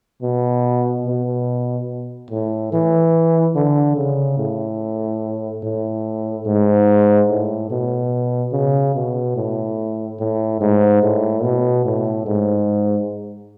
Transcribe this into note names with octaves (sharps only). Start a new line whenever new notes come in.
B2
B2
A2
E3
D3
C#3
A2
A2
G#2
A2
B2
C#3
B2
A2
A2
G#2
A2
B2
A2
G#2